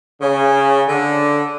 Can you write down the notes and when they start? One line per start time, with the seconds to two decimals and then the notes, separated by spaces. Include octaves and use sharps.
0.21 C#3
0.88 D3